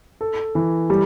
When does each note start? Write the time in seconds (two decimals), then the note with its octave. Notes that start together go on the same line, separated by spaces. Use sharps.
0.21 A4
0.55 E3
0.90 G3